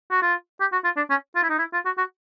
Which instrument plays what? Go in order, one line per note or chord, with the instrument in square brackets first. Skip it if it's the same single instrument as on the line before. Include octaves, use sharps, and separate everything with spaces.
[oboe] F#4
F4
G4
F#4
F4
D4
C#4
F4
E4
D#4
E4
F4
F#4
F#4